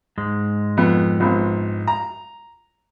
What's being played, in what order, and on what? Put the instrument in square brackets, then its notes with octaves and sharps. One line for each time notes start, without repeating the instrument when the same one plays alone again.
[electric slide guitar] G#2 G#3
[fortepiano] F2 B3
A#1 B3 C4
A#5